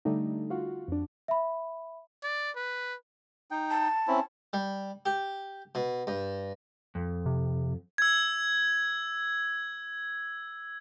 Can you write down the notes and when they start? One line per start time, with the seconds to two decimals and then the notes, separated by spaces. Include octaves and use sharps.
0.05 D3 G3 A3 D#4
0.50 F4 F#4
0.88 F2 D4
1.28 E5 B5
2.23 D5
2.56 B4
3.51 D#4 G5
3.70 A5
4.08 C4 C#4 E4
4.53 G3
5.06 G4
5.75 B2
6.07 G2
6.95 F2
7.26 C3
7.98 E6 G#6